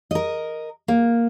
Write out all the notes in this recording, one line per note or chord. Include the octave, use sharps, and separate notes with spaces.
A#4 D#5
A#3